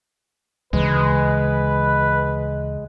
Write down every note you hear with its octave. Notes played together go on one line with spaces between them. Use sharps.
D2 C#3 E3 G#3 B4